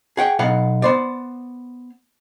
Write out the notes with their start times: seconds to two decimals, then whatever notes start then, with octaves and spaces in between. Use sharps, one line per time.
0.17 G#4 F#5 G5
0.39 B1 B3 F5 F#5
0.82 B3 C5 D5